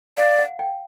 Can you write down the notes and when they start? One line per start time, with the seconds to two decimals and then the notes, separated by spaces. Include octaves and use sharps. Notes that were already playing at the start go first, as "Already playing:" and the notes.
0.17 D5 F5
0.39 F#5
0.59 G5